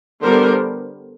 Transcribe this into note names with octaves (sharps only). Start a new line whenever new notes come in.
D3 G3 B3 A#4 C5